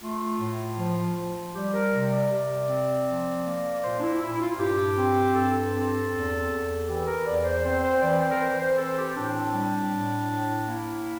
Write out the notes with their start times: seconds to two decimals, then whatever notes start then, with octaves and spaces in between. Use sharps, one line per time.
0.02 A3 F4
0.40 A2
0.78 F3
1.16 F3
1.54 G3 G4
1.74 A#4
1.93 C3
2.11 D5
2.31 C3
2.68 C4
3.07 F3
3.45 A#3
3.83 A#2 C5
3.97 D4
4.01 E4
4.21 A#2 E4
4.33 E4
4.41 F4
4.54 F4
4.59 G2 G4
4.97 C4
5.35 G2 A4
5.73 C4
6.11 E2
6.49 E2
6.88 E3 G4
7.07 A#4
7.25 E2 D5
7.44 C5
7.64 C4 C5
7.83 C5
8.01 E3 D5
8.21 C5
8.31 A#4
8.40 E3 C5
8.59 C5
8.78 C4 A4
8.97 G4
9.15 A2 D4
9.54 G3
9.92 A2
10.30 A2
10.68 A#3 E4